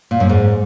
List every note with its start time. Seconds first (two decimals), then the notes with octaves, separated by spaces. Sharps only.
0.11 A#2
0.20 F#2
0.29 G#2